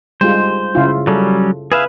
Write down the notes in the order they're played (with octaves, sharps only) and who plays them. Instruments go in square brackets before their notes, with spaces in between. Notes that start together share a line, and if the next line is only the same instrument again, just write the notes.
[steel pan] G3 G#3 F4 [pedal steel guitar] C5
[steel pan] C#3 E4 F4
[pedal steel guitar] F#3 G3 C#4 [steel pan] A4
[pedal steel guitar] G#4 E5 F5 [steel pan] B4